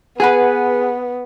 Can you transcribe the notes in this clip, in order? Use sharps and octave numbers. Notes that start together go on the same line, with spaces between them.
B3 G#4 B4 F#5 G#5